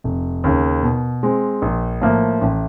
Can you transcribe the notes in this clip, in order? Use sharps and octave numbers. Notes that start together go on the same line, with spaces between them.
F1
D#2 C#3
B2
G#3 C4
A#1
A2 F3 A#3
A1